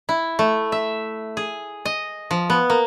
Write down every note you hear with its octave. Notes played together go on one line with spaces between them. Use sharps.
E4
A3
E5
G#4
D#5
F3
B3
A#3